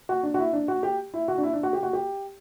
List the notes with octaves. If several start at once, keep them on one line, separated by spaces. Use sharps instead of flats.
F#4
D4
F#4
E4
D4
F#4
G4
E4
F#4
D4
E4
D4
F#4
G4
F#4
G4